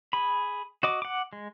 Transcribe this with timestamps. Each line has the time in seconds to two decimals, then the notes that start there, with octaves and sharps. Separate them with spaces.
0.13 G#4 B5
0.83 F#4 D#5 D6
1.02 F#5 D6
1.33 G#3